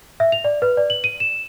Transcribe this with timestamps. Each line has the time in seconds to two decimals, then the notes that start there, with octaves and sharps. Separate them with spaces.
0.20 E5
0.32 F7
0.44 D5
0.62 B4
0.77 D5
0.90 F#7
1.04 D#7
1.20 E7